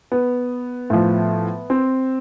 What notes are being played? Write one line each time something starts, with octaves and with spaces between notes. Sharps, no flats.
B3
A2 F3
C4